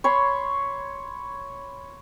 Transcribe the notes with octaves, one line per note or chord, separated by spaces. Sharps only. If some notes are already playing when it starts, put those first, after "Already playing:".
C#5 B5 C6